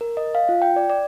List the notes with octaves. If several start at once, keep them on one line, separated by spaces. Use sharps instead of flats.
A#4
D#5
F5
F4
G5
D5
D5